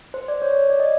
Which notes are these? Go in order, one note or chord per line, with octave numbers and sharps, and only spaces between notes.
C5
D5
C#5
D5
D#5